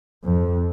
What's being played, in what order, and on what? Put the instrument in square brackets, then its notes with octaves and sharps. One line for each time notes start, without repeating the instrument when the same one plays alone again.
[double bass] F2